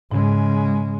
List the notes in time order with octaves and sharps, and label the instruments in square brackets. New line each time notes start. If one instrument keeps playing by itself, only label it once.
[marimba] G#2 [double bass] C#3 G#3